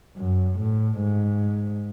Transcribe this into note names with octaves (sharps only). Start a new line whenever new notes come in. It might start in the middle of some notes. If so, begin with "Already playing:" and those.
F#2
A2
G#2